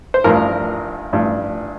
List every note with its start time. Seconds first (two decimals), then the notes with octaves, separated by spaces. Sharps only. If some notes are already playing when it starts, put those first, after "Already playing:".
0.14 C5
0.24 A1 G2 F3 A#4
1.12 A1 G2 F3